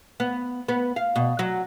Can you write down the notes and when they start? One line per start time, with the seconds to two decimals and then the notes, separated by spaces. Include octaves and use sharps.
0.20 B3
0.68 B3
0.96 F5
1.16 B2
1.39 F#3